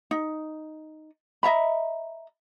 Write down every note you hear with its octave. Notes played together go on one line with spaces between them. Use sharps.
D#4
D#5 E5 A#5 B5